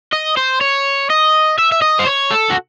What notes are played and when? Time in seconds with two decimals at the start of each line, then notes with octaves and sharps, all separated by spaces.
0.13 D#5
0.37 C5
0.61 C#5
1.10 D#5
1.59 E5
1.72 E5
1.82 D#5
1.99 C5
2.06 C#5
2.31 A4
2.50 F#4